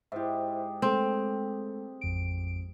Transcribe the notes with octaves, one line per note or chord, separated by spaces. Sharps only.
G#2 E4 G4 C5 E5
G#3 A3 C4 A4
A1 F2 D7